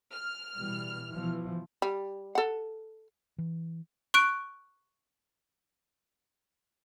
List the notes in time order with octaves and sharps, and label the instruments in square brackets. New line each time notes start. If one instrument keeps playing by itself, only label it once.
[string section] F6
[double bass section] B2 E3 G3
B2 E3 F3
[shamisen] G3
A4 F#5
[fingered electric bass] E3
[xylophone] C#6 F#6 D7